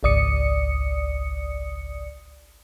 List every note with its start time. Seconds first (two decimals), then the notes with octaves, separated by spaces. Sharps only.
0.03 G#1 C#2 D5 D#6 C#7